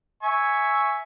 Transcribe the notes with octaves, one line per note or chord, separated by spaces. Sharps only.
E5 G#5 C#6